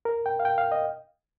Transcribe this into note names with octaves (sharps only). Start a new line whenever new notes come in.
A#4
G5
F5
G5
F5
D#5